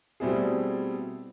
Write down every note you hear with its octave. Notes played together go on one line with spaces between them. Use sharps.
B2 G3 A3 C4 E4 G#4